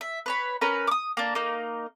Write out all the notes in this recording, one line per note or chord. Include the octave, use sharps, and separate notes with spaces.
E5
B4 C#5 B5
C#4 A#4 B4
D6 D#6
A#3 D4
A#3 D#4